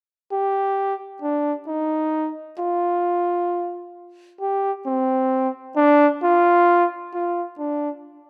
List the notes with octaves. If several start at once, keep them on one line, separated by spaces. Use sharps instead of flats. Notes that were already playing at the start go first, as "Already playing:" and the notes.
G4
D4
D#4
F4
G4
C4
D4
F4
F4
D4